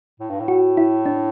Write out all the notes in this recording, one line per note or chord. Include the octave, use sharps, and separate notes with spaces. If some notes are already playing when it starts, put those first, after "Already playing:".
A2
G2
A2
F#4
E4
D4